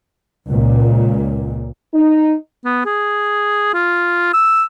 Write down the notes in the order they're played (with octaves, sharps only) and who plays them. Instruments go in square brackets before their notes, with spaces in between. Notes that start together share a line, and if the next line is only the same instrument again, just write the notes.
[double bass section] C#2 A#2
[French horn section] D#4
[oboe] B3
G#4
F4
E6